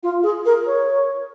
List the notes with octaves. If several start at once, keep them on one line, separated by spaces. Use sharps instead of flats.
F4
G#4
A#4
C#5